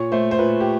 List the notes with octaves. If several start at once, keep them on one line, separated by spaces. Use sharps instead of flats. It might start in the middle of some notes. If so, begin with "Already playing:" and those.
Already playing: A#2 C#5
A3 C5
C5
A#2 B4
G4